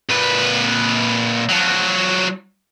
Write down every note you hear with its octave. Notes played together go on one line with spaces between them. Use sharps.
A#2 B4
F3 F#3